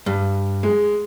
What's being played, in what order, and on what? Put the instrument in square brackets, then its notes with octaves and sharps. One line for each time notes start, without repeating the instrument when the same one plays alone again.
[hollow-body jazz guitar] G2
[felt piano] G#3